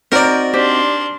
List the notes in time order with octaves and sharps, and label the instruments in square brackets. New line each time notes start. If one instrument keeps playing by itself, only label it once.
[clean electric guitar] C4 D#4 F#4 [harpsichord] A#4 D5 [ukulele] C5
[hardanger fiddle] D4 C6 [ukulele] G4 C5